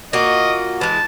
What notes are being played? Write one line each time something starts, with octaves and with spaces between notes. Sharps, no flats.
A#3 F4 F#4 D#5
E3 G#3 A5